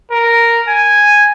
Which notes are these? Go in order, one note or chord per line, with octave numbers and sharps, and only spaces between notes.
A#4
G#5